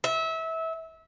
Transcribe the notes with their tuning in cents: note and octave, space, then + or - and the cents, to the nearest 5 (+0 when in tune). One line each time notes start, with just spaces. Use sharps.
E5 -25